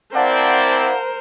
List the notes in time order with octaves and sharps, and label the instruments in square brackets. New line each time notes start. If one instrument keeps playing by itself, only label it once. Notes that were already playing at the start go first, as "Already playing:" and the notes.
[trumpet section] C4 E4 D5 [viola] A#4 C5 [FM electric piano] F5 F#5 A5